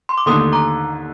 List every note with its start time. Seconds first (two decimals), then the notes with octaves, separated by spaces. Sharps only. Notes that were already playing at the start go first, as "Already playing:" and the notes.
0.09 C6
0.18 D6
0.26 D#2 D3 A3 D#4 C6 D#6
0.52 A#5 D6